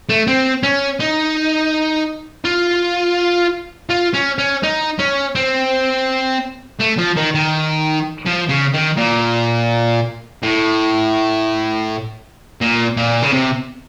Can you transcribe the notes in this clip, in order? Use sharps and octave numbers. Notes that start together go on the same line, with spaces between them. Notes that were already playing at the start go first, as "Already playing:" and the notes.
A3
C4
C#4
D#4
F4
F4
C#4
C#4
D#4
C#4
C4
A3
F3
D#3
D#3
F3
C#3
D#3
A#2
A2
A#2
A#2
C#3
C3